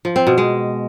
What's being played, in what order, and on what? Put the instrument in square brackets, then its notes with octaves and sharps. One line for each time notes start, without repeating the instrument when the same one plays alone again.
[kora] F3
C4
B2
G#3